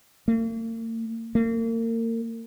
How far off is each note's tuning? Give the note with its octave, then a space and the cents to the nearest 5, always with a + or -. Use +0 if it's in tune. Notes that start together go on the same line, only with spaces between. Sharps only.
A#3 -45
A#3 -35